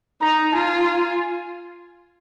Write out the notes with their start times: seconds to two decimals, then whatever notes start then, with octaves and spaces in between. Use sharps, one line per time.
0.22 D#4 A#5
0.53 F4 G#5